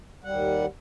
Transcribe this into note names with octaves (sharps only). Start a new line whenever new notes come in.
D#2 G3 F#5